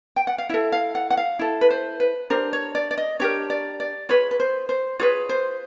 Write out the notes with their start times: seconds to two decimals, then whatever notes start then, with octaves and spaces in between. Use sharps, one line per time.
0.16 G5
0.27 F#5
0.38 F5
0.49 E4 A4 E5
0.72 F5
0.95 F#5
1.10 F#5
1.17 F5
1.39 E4 A4
1.61 B4
1.70 C5
2.00 B4
2.30 D4 G4 A#4 C5
2.53 C#5
2.75 D5
2.91 D5
2.98 D#5
3.19 D4 G4 A#4 C#5
3.50 D5
3.80 D5
4.09 F4 G#4 B4 C#5
4.31 B4
4.40 C5
4.69 C5
4.99 F4 G#4 B4 C#5
5.29 C5